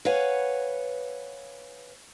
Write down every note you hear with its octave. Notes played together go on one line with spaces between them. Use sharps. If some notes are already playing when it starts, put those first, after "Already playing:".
B4 C#5 F5 F#5 G#5